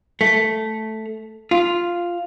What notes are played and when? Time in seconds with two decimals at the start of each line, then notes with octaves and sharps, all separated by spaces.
0.21 A3
1.51 F4